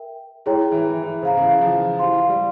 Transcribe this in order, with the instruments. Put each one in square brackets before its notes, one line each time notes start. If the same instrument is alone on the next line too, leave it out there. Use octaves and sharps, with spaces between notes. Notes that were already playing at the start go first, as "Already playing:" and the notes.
Already playing: [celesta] A#4 E5 G5
[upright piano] G#3 [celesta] E4 G#4 C#5 G5 A#5
[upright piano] E3
E3
E3
[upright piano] C#3 [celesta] C5 F5 A#5
[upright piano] C#3
E3
F3
[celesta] E4 G4 C5 F5 C6
[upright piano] G3